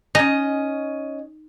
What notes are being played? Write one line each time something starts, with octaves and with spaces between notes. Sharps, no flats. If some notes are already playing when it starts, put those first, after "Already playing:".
C#4 D#4 D#5